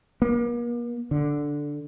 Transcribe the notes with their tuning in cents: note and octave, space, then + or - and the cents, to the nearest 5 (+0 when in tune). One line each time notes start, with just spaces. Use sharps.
A#3 +40
D3 +0